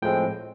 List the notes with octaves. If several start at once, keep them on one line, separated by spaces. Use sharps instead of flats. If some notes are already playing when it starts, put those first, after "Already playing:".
A2 F3 G#3 C4 G5